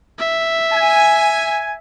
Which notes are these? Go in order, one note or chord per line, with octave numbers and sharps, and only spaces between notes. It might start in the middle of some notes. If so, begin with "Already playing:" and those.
E5
G#5